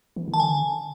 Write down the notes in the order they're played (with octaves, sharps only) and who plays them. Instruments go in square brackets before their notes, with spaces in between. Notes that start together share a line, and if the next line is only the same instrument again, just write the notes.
[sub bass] E3
D#3
[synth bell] A5
[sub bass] D3 [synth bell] G#5